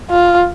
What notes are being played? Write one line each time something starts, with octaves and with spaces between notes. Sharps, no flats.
F4